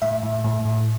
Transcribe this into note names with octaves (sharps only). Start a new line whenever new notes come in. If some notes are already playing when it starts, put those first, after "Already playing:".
A2 E5
A2
A2
A2